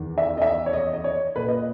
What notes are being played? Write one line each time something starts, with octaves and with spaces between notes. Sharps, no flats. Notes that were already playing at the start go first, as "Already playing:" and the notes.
Already playing: E2 D#3
E5
D#5
E5
C#5
D#5
D#5
C#5
A#2 B4
D#5